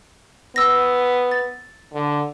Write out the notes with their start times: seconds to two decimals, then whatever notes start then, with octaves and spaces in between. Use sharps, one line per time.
0.56 B3 E6 A#6
1.31 A6
1.93 D3